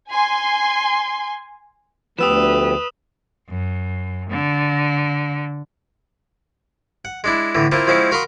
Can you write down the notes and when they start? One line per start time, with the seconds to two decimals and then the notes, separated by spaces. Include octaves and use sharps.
0.10 G#5 C6
2.19 D2 F3 B3 G4 B4 D#6 E6 E7
3.49 F#2
4.30 D3
7.05 F#5
7.24 G#3 D4 E4
7.55 A2 D3 E3
7.72 A#3 C4 E4 F4
7.87 F3 G#3 C4 C#4 E4
8.11 F#4 A#4 F5 B5 C6 D#6